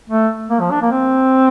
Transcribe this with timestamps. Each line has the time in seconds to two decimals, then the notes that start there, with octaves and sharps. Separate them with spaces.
0.10 A3
0.50 A#3
0.61 F3
0.71 D4
0.82 A#3
0.91 C4